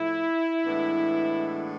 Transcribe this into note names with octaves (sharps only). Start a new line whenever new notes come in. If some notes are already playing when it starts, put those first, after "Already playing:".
Already playing: A2 F3 A3 E4
A2 E3 G#3 B3 D4